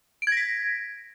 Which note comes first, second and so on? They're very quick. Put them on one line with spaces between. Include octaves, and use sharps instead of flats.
D7 G#6 A#6 B6